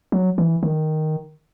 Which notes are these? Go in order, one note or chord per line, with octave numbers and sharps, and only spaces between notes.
F#3
E3
D#3